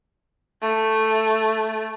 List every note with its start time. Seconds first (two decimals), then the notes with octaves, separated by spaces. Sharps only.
0.62 A3